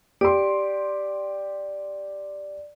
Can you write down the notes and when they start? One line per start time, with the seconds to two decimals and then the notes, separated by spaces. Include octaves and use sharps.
0.21 G4 D5 C6